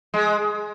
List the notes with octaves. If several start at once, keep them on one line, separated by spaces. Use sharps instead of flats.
G#3